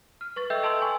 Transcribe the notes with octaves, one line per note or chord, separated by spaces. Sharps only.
F6
B4 C#6 A6
A4 D#5 E5 G5 E6 G6
A4 D#5 A5 C6 E6 F#7
G#5 C#6